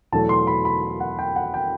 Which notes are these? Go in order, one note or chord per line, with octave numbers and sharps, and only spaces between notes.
E2 B2 F#3 A3 A5
C6
B5
B5
F#5
G5
F#5
G5